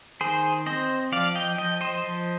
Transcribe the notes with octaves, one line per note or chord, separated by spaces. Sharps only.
D#3 G#4 C5
C4 C5 D#5
F3 D5 F5
D#5 G5
F3 D#5 G5
C5 D#5
F3